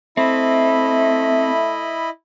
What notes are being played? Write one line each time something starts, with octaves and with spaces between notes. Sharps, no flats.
A3 C4 E4 D#5 B5